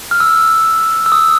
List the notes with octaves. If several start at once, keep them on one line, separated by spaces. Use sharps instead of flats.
F6
E6
E6
D#6